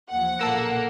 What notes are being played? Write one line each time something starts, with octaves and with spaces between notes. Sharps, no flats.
D#2 F3 F#5
B1 A#2 C#3 A#3 A4 E6